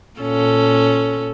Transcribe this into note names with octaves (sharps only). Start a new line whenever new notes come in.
A#2 C#4 A4